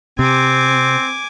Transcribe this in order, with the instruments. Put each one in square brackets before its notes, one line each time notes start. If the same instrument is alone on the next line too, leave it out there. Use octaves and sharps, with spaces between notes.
[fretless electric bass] C3 [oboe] C4 [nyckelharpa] G#5 D6